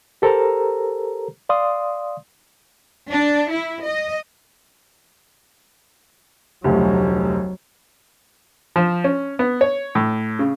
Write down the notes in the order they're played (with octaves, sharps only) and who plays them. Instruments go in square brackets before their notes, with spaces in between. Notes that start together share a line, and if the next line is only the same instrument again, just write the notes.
[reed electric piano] G4 A4 A#4 C5 A#5
D5 F5 C6 D#6
[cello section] D4
E4
D#5
[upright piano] F1 D2 [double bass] F#3
[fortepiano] F3
C#4
B3
C#5
A2
C#3